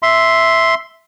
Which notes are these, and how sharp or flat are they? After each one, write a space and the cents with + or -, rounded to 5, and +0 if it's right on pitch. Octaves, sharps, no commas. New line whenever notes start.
E5 +0 C6 +0